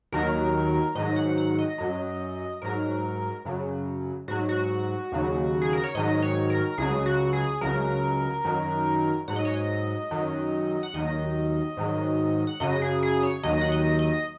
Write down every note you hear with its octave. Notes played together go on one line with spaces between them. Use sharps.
D#2 D#3 F#3 A#4
G#2 D#3 F#3 D#5
F#5
F#5
D#5
F#2 F#3
G#2 F#3 A#4
F#2 C#3 F#3
G#2 F#3 F#4
F#4
D#2 C#3 F#3
G#4
A#4
C#5
G#2 D#3 F#3 D#5
C#5
A#4
C#2 C#3 F#3 G#4
F#4
G#4
C#2 C#3 F#3 A#4
F#2 D#3 F#3
G#2 F#3 F#5
D#5
C#5
D#5
F#2 D#3 F#3
F#5
D#2 D#3 F#3 D#5
G#2 D#3 F#3
F#5
F#2 C#3 F#3 D#5
G#4
G#4
C#5
D#2 D#3 F#3 D#5
F#5
D#5
D#5